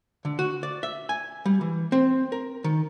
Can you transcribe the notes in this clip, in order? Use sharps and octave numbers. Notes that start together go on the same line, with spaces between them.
D3
F#4
D5
E5
G#5
G3
E3
C4
A#4
D#3